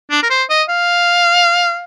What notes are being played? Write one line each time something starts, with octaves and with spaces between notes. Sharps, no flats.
D4
A#4
C5
D#5
F5